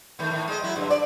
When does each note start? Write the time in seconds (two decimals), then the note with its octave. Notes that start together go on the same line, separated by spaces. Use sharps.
0.19 D#3 A3
0.30 A2 D#3
0.48 G#3 D#5
0.63 F#3 E4
0.76 G2 D3
0.90 D5